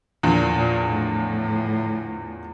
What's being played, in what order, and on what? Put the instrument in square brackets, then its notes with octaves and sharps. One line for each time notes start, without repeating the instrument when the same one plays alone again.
[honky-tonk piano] E2 D3 F3 [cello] A#2
[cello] A#2
A2